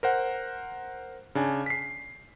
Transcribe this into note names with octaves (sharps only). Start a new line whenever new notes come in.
A#4 C5 F#5
C#3 D4 G#5
B6 C7